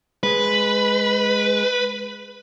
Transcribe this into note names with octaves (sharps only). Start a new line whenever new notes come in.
G#3 B4